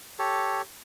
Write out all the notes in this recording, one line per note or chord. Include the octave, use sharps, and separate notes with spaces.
G4 A4 C#5